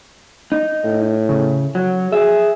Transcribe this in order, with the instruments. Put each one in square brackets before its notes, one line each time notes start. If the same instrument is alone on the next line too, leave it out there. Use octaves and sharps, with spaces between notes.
[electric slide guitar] D#4
[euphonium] A2
[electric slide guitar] C#3
F#3
[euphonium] G#4 [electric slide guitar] E5